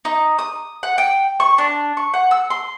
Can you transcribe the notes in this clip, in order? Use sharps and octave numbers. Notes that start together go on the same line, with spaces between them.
D#4
D#6
F#5
G5
C#6
D4
C#6
F#5
E6
C6